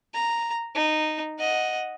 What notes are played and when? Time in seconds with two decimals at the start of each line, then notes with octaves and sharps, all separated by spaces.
0.14 A#5
0.75 D#4
1.39 D#5 F#5